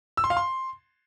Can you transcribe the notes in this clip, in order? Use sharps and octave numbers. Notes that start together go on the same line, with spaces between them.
E6
C6
F5
C6